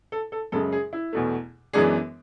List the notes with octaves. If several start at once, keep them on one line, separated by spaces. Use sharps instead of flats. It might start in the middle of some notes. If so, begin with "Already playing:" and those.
A4
A4
F#2 C#3 G#3 A4
G#4
E4
E2 B2 A3
F#2 E3 G#3 B3 D4 G#4